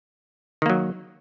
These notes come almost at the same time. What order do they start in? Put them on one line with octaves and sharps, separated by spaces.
D#3 A#3 F#3